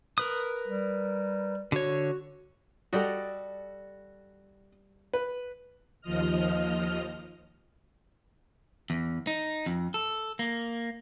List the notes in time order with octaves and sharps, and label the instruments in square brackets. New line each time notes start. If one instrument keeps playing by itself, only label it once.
[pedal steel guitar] A#4 B4 D#6
[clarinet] G3
[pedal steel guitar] D3 C#5 [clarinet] F#4
[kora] G3 D5 D#5 [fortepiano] F#4 A4
[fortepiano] B4
[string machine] D#2 F3 D#5 F6
[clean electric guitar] E2
D#4
F2
A4
A#3